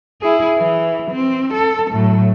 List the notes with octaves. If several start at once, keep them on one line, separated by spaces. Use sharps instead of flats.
E4 G#4
E3
C4
A4
A2 F#3